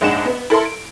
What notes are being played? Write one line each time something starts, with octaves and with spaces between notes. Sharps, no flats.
A#1 G#2 G#3 D4 F#5 E7
B3
E4 A4 A#4 C6
D7